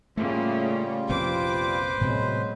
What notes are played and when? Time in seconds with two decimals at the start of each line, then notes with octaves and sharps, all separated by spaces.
0.17 A2 C#3 G3 A3 A#3 F4
1.09 A#1 F2 C3 B4 C5 D6
2.01 A2 C3 F#3 G#3 B3